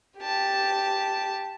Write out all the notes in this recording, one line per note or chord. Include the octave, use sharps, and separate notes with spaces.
G4 A5